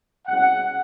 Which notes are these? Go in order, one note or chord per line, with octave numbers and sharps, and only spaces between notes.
C2 B2 G#3 C#4 F#5